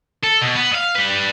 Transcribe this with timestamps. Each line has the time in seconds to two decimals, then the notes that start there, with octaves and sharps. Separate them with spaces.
0.23 A4
0.41 B2
0.55 B3
0.72 D#5 F5
0.95 G3 B4